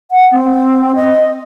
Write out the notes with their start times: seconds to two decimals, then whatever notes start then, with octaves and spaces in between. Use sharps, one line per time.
0.11 F#5
0.32 C4
0.95 D#5